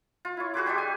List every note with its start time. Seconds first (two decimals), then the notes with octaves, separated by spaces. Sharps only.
0.25 F4
0.37 E4 C#5
0.54 F#4 G#4 B4 D6
0.66 G3 G#3 D4 G4
0.78 G#5